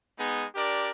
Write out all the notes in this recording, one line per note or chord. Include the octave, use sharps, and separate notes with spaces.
G#3 B3 D#4 G#4
D4 G4 A#4 D5